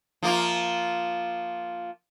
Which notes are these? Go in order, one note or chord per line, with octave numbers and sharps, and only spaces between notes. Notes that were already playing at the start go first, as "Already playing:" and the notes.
F3 A#3 F4